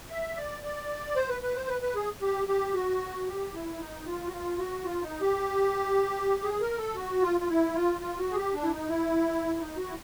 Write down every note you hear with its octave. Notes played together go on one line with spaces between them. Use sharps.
E5
D5
D5
C5
B4
B4
C5
B4
B4
G#4
G4
G4
F#4
G4
E4
D#4
F4
F#4
F4
F#4
F4
D#4
G4
G#4
A#4
A4
F#4
F4
F4
E4
F4
F4
F#4
G#4
G4
D4
E4
D#4
E4
D#4
F#4
E4